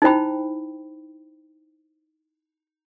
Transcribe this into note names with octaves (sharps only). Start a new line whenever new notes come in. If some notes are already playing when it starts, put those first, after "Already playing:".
D#4 E4 C5 G5 B5